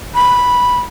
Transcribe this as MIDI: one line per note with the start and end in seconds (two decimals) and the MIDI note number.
0.15 0.80 83